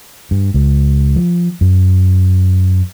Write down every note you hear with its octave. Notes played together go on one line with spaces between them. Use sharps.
G2
C#2
F3
F#2